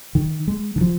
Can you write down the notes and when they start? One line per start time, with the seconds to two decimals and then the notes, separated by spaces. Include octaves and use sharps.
0.15 D#3
0.47 G#3
0.76 D#3
0.81 F3